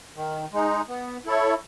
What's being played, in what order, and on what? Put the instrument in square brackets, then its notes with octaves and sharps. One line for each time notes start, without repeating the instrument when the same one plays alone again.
[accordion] D#3
G#3 D#4
B3
E4 A4 C#5